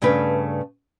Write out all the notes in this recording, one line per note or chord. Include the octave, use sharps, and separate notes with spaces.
G2 C#3 A3 D4 B4